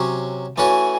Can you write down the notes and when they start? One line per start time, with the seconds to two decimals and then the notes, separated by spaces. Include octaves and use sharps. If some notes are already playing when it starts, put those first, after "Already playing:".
Already playing: C3 F#3 C#4
0.58 E3 A3 C#4 F#4 G#5